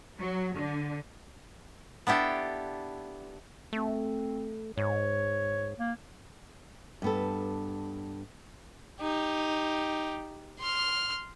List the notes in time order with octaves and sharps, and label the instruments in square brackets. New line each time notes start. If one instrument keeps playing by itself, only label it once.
[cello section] F#3
D3
[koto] B3 D4 E4 G4 A4
[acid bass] A3 [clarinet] C4
[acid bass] G#2 [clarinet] C#5
[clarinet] A#3
[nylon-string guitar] G2 B3 A4
[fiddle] D#4 G4
C6 F6